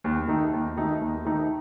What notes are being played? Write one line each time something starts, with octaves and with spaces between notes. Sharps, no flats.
D#2
D#3 A3 D#4
D#2
D#3 A3 D#4
D#2
D#3 A3 D#4